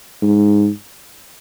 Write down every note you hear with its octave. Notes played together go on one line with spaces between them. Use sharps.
G#2